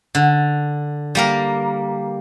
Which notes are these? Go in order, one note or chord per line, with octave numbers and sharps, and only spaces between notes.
D3
G3 A#3 A#4